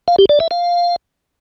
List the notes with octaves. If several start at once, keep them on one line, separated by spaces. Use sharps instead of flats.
F5
G4
D5
E5
F5